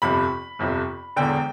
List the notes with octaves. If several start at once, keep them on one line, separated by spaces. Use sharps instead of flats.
G1 F2 C3 F3 B5
G1 F2 C3 F3
E1 E2 D3 G5